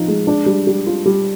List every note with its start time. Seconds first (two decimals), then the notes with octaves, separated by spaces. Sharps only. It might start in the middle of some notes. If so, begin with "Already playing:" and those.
Already playing: F3 D#4
0.08 G#3
0.27 D4
0.46 G3
0.67 G3
0.86 F4
1.05 G3